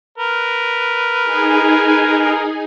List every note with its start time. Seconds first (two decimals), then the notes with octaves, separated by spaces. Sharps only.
0.18 A#4 B4
1.22 D#4 G#4 G#5